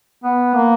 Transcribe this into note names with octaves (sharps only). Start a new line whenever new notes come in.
B3
A#3